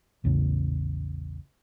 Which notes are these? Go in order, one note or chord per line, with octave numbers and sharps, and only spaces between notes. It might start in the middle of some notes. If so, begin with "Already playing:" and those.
A#1 E2 A2 C#3